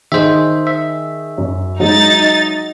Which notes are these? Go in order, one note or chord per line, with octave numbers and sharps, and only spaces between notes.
D#3 G#4 C5 E5
E5
F#2
F#3 G#3 D#4 A6